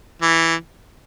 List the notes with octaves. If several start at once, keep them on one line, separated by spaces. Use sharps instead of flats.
E3